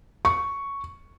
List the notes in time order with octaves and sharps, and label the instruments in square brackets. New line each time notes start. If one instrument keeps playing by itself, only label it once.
[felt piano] C#6